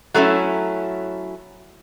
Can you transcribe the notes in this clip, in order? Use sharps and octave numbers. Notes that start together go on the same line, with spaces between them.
F#3 A3 C#4 E4